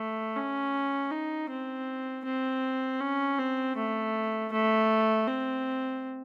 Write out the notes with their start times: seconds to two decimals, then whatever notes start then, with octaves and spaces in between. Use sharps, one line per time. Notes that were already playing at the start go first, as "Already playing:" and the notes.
Already playing: A3
0.36 C#4
1.11 D#4
1.50 C4
2.25 C4
3.00 C#4
3.39 C4
3.77 A3
4.52 A3
5.28 C4